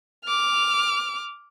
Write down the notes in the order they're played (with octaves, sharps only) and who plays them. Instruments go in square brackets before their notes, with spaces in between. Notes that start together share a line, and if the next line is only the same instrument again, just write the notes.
[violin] D6 F6